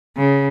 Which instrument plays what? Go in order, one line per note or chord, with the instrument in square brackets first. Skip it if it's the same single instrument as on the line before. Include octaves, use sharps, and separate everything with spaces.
[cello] C#3